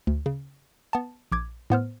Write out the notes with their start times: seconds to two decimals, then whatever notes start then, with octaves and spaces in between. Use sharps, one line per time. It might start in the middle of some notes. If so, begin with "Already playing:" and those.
0.07 D2
0.26 C#3
0.93 B3 A5
1.32 A#1 D6 G#6
1.70 A2 B3 C5 F6